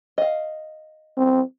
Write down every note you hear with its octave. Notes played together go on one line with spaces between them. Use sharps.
D#5 F5
C4